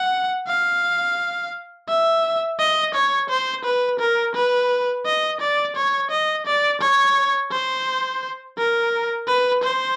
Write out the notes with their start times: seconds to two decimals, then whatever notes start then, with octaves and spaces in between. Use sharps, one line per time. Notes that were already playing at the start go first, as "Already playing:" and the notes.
Already playing: F#5
0.48 F5
1.89 E5
2.59 D#5
2.94 C#5
3.30 C5
3.65 B4
4.00 A#4
4.35 B4
5.06 D#5
5.41 D5
5.76 C#5
6.11 D#5
6.46 D5
6.81 C#5
7.52 C5
8.58 A#4
9.28 B4
9.63 C5